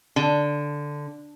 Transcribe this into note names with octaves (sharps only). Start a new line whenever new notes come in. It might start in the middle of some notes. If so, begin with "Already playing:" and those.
D3